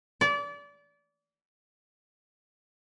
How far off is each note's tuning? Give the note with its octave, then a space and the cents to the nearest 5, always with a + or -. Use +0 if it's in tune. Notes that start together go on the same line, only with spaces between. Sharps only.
D5 -30